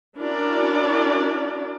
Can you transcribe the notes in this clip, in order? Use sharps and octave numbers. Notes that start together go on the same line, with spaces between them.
C#4 D4 E4 F#4 A#4 D5